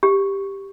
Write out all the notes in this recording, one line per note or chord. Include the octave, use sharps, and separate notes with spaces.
G4